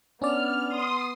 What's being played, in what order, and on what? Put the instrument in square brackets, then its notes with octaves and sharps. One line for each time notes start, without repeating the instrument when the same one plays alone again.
[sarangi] B3 [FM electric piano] C#4 D4 D5 [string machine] F6
[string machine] C6 D#6